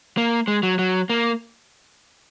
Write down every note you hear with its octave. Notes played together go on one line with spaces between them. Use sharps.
A#3
G#3
F#3
F#3
A#3